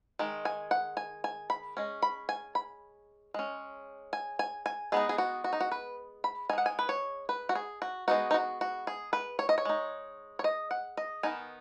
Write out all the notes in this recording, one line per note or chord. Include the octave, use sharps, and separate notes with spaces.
D#3 G#3
G#5
F#5
G#5
G#5
B5
G#3 C#4
B5
G#5
B5
G#3 C#4
G#5
G#5
G#5
G#3 B3 D#4 G#4
G#4
F#4
F#4
D#4
F#4
B4
B5
G#3 D#4 F#5 G#5
G#5
B4
C#5
B4
F#4
G#4
F#4
G#3 B3 D#4 F#4
D#4
F#4
F#4
G#4
B4
C#5
D#5
C#5
G#3 D#4
C#5
D#5
F#5
D#5
D#3 B3 D#4 G#5